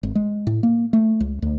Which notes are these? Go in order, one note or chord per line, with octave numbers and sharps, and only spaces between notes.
G#1
G#3
A2
A#3
A3
C#2
D2